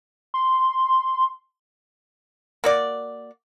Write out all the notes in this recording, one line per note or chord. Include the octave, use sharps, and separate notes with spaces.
C6
A#3 F#4 D5